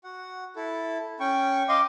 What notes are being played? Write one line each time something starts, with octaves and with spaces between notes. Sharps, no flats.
F#4 F#5
E4 A4
C#4 G5 C#6
D#5 F5 C6 D6